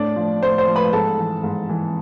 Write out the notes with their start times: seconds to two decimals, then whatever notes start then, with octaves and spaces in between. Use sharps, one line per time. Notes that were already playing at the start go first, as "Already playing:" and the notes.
Already playing: A2 D4 D5
0.16 F3
0.42 A2 C5
0.58 C5
0.68 F3
0.76 B4 B5
0.93 G#2 A4 A5
1.17 E3
1.44 G#2
1.69 E3